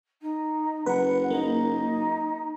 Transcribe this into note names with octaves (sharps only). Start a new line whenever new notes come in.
D#4
F#1 B4 F#5
A#3 D#4